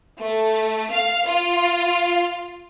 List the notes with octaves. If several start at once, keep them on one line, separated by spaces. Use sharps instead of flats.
A3
F5
F4